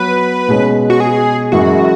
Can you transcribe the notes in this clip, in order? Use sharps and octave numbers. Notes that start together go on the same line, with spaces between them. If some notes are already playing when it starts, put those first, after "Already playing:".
Already playing: F#3 B3 F#4 B4
B2 G#3 C#4
F#4
G#4
F#2 E3 G#3 F#4